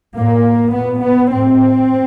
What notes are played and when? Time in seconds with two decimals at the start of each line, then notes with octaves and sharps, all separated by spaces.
0.18 A2 A#3
0.75 A#2 B3
1.03 B3
1.32 A2 C4